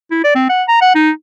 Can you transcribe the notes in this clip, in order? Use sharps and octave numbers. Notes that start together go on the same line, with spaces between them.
E4
D5
C4
F#5
A#5
F#5
D#4